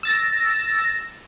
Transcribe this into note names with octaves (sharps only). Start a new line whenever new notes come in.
E6 A6 A#6